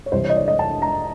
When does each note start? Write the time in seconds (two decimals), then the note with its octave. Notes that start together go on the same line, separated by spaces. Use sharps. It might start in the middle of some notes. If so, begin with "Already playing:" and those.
0.06 C#5
0.12 C2 C3 E3 C5
0.24 C#5
0.29 D#5
0.36 D5
0.48 D#5
0.59 A5
0.82 A#5